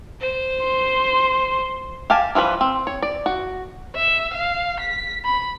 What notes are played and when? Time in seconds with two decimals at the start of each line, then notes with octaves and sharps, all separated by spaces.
0.20 C5
0.63 C6
2.10 G4 F5 G#5 A5
2.35 E3 F3 G3 B4
2.61 C4
2.87 C#5
3.02 D5
3.26 F#4
3.95 E5
4.34 F5
4.80 B6
5.25 B5